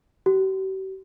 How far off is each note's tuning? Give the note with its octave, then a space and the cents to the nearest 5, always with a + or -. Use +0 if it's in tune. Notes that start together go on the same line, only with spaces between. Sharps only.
G4 -45